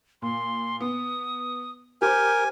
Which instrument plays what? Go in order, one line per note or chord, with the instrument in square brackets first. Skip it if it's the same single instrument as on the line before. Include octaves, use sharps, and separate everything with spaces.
[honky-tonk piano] A#2 [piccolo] C6
[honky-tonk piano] B3 [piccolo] D#6
[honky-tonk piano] G4 C5 [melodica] A#4 [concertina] G#5 [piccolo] G6